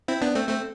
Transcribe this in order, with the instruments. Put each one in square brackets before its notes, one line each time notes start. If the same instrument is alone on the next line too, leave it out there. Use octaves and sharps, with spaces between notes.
[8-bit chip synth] C4 E4
B3 D4
A3 C4
A3 C4